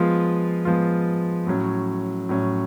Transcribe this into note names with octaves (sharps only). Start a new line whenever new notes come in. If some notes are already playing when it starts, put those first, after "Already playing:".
Already playing: F3 G#3 B3 F4
F3 G#3 B3 F4
A2 F#3 C#4
A2 F#3 C#4